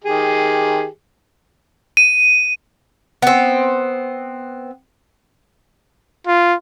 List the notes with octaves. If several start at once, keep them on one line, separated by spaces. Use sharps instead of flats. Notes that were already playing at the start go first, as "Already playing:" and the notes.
D#3 G4 G#4
D#7
B3 C4
F4